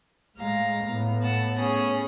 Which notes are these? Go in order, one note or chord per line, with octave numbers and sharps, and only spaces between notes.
A2 G#3 F5 A#5
A2 B3
F#5 A5
C#4 G#4